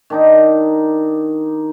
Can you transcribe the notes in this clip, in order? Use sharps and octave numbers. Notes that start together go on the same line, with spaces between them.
D#3 D4 D#4